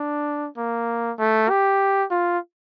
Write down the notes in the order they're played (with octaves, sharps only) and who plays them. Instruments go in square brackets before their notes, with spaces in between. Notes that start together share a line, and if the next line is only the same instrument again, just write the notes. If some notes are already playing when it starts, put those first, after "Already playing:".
Already playing: [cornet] D4
A#3
A3
G4
F4